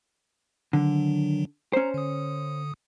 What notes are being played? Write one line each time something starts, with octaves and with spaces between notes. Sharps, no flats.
D3 D#3 F#3
C#4 C5 A#5
D3 D#6